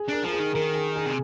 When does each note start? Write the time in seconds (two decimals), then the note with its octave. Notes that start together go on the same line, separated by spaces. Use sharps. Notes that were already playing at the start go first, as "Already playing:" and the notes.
Already playing: G#4
0.08 D4 A#4
0.23 F3 A#4
0.33 G#4
0.39 D#3
0.54 D#3 A#4
0.74 G#4
0.96 G#4
1.06 C3